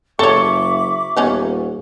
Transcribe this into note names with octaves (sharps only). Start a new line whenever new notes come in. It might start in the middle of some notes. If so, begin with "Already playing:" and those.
F#1 A4 C#5 E5 B5 C#6 D6
D#1 B3 C#4 D#4